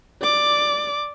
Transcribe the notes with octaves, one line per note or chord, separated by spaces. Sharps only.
D5 D6